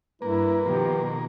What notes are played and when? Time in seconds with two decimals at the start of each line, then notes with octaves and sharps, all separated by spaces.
0.22 G2 A#3 E4 B4
0.64 B2 D#3 F3 G4